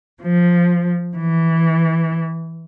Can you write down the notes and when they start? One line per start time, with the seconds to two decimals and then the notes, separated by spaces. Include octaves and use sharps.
0.22 F3
1.16 E3